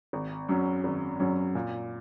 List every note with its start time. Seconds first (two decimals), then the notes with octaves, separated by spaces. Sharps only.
0.13 G#1
0.49 F#2 F#3 C#4
0.84 G#1
1.20 F#2 F#3 C#4
1.55 A#2